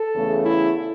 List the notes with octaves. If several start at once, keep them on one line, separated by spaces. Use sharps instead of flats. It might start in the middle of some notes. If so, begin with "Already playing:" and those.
Already playing: A4
E2 C#3 A3
E4